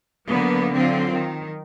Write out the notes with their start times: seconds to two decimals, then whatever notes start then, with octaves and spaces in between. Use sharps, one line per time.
0.28 D3 F#3 A#3 B3
0.72 D3 F#3 C4 F4
1.14 D#3